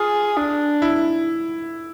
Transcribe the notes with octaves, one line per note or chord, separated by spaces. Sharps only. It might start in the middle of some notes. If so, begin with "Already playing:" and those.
Already playing: F4 G#4
D4
E4